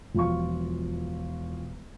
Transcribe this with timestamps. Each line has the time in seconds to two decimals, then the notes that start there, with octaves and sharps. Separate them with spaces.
0.15 E1 F3 F4 C#6